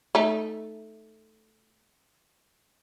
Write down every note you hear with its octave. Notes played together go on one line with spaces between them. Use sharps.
A3 D#4